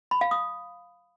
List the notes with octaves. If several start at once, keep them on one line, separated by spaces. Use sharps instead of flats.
B5
F5
D#6